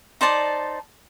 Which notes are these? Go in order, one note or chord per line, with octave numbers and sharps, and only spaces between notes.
D#4 C5 D5 A5